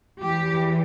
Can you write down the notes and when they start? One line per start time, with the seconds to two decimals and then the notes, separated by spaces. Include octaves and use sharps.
0.22 E2 E3 G4